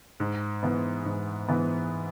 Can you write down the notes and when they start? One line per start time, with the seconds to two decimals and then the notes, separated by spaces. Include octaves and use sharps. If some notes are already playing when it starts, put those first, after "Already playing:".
0.20 G#2
0.63 E3 B3
1.05 G#2
1.48 E3 B3